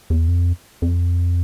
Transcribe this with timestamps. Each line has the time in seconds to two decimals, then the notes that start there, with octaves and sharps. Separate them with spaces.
0.10 E2
0.28 F2
0.82 F2